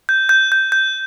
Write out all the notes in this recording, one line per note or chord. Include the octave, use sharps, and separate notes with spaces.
G6
G6
G6
G6